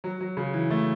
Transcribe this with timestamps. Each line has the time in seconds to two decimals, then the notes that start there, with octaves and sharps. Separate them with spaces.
0.04 F#3
0.21 F#3
0.37 C#3
0.53 E3
0.71 A3